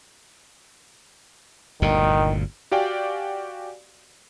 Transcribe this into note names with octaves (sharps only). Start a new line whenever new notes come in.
G1 D2 A#2 D#3
F#4 G4 D5 F5 G5 G#5